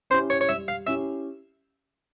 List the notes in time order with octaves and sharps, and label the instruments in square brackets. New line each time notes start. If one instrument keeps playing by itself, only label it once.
[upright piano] C#4 E4 G4 [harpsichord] C5
[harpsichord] C#5
C#5
[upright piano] G3 [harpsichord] E5
[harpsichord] F5
[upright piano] C#4 E4 G4 [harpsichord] E5